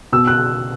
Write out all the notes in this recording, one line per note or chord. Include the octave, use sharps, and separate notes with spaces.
B2 E6
F#6